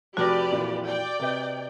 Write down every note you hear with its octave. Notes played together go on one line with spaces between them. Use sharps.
F1 F#4 G4 B4 D5 F6 A#6
F2 A#2 E3
D5 G5
C3 B4 D#5